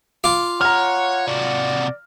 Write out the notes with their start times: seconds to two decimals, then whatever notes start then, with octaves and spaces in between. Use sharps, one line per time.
0.24 F4 D6
0.61 C#5 F#5 A#5 F6
1.27 C3 F#4 D5